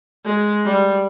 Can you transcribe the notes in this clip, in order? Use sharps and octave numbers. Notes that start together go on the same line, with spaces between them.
G#3
G3